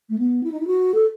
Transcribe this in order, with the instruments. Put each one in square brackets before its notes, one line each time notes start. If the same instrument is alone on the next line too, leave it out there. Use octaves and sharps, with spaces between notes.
[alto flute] A3
B3
E4
D#4
E4
F#4
A4